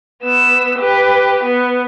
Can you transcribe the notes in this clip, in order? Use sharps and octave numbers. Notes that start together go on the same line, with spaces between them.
B3 E6
G4 B4
B3